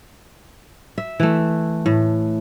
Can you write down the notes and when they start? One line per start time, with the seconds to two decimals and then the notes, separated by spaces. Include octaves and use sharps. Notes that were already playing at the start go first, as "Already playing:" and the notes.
0.98 E5
1.20 E3 A3
1.86 A2